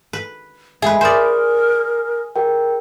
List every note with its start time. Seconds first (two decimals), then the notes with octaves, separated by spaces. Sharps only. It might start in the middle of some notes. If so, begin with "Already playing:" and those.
0.13 B4
0.82 G#3 G#4 B4 E5 B5
1.01 A#4 C5 D5 G#5 D#6
2.36 G#4 A#4 G5